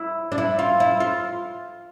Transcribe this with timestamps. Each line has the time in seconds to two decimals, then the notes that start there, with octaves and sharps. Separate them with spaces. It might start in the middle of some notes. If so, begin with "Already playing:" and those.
Already playing: E4
0.32 D4
0.38 E4
0.59 F4
0.80 E4
1.00 F4